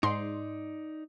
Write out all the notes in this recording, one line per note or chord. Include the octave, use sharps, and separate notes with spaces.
G#2 D#4 D5 C6